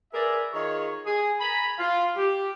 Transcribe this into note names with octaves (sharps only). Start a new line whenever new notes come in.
G#4 A#4 B4 D5 E5
D#3 F4 G#4 C#5
G#4
G#5 A#5 B5
F4
G4